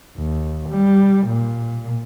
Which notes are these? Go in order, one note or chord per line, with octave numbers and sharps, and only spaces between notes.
D#2
G3
A#2